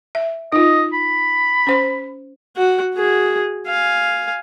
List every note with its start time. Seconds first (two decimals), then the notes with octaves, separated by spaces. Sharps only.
0.15 E5
0.52 D#4 F4 D#5
0.93 B5
1.67 C#4 C5 C6
2.56 F#4 F#5
2.94 F#4 G#4
3.67 F5 G#5